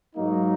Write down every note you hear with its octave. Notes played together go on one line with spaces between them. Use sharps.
G#2 F#3 A#3 D#4